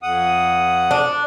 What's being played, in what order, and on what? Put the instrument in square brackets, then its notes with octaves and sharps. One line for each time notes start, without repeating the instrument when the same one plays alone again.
[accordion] F2 F#5 D#6
[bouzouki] D4